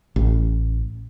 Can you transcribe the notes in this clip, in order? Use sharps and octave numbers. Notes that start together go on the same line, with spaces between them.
A1